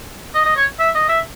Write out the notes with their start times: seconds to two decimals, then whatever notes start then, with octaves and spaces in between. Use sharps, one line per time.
0.34 D#5
0.45 D#5
0.56 C#5
0.79 E5
0.95 D#5
1.08 E5